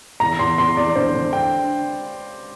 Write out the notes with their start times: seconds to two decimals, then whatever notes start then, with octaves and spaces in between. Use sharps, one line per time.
0.20 E2 A#5
0.39 E2 C6
0.58 E2 C6
0.77 E2 D5
0.96 D3 C5
1.14 D3
1.33 G5